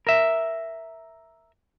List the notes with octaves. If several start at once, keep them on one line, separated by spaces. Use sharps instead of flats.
A#4 E5